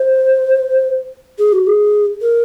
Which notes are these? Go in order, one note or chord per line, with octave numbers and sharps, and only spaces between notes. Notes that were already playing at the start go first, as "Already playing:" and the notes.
Already playing: C5
G#4
F#4
G#4
A#4